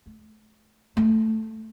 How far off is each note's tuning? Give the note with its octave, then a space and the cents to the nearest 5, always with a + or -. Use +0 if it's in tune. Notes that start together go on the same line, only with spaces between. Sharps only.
A3 -30
A3 +5